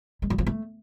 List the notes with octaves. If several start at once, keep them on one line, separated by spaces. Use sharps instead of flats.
G#3
F#3
F3
A3